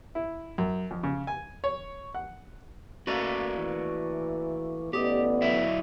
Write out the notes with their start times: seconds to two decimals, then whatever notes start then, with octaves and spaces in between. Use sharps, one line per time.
0.15 E4
0.58 F#2
0.91 F2
1.03 C#3
1.27 G#5
1.64 C#5
2.15 F#5
3.07 A3 A#3 F#4 B4 D5
3.55 E3
4.93 A1 B3 G4 D5 D#5
5.42 F#3 E4 E5